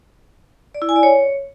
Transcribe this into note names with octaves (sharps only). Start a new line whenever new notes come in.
D5
E4
G#5
D5
C#5